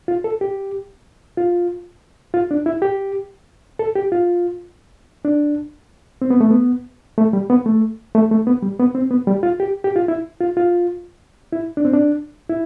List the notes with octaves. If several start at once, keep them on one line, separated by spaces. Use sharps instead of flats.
F4
A4
G4
F4
F4
D4
E4
G4
A4
G4
F4
D4
C4
B3
A3
B3
A3
G3
B3
A3
A3
A3
B3
G3
B3
C4
B3
G3
F4
G4
G4
F4
E4
F4
F4
E4
D4
C4
D4
E4